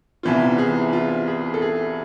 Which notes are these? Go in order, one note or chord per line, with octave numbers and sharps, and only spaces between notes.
C2 C3 E3 B3 F4
G#4
F4
G#4
A4
G#4